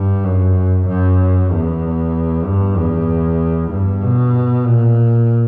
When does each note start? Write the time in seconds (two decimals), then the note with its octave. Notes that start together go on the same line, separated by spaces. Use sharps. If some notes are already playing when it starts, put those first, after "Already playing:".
Already playing: G2
0.25 F#2
0.88 F#2
1.51 E2
2.46 G2
2.76 E2
3.71 G2
4.03 B2
4.67 A#2